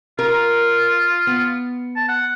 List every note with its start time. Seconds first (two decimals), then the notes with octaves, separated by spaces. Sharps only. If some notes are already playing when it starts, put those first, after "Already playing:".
0.19 F4 A#4
1.27 B3
1.96 A5
2.09 F#5